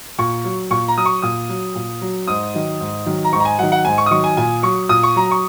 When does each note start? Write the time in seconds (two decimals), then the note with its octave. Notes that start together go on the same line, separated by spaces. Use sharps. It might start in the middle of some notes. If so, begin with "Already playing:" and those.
0.18 A#2 C#6
0.45 F#3
0.71 A#2 C#6
0.88 A#5
0.97 F#3 D#6
1.06 C#6
1.22 A#2 D#6
1.49 F#3
1.75 A#2
2.01 F#3
2.28 G#2 D#6
2.54 D#3 F#3
2.80 G#2
3.06 D#3 F#3
3.24 A#5
3.32 G#2 C#6
3.40 A#5
3.45 G#5
3.59 F#3 F#5
3.63 D#3
3.72 F#5
3.85 G#2 G#5
3.98 C#6
4.06 D#6
4.11 D#3 F#3 C#6
4.24 G#5
4.37 A#2 G#5
4.63 F#3 C#6
4.89 A#2 D#6
5.03 C#6
5.16 F#3 A#5
5.31 C#6